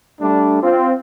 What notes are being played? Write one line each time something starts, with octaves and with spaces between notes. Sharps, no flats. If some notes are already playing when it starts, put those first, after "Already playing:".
G3 A3 D4
C4 F4